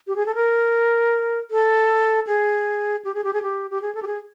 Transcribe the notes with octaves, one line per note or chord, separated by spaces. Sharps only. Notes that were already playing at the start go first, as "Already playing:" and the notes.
G4
G#4
A4
A#4
A4
G#4
G4
G#4
G4
G#4
G4
G4
G#4
A4
G4
G#4